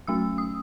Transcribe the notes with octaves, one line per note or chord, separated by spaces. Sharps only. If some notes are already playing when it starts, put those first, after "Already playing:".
F#3 A3 C#4 E6
D#6